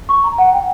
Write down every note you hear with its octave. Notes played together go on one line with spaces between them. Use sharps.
C#6
A#5
F#5
G5